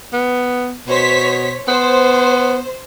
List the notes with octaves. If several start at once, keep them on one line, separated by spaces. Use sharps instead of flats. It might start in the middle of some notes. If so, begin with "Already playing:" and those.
B3
B2 C5 C#5 B6
B3 C5